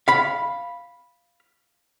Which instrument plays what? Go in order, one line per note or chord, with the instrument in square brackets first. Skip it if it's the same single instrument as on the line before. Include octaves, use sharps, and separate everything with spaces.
[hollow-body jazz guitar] F5 B5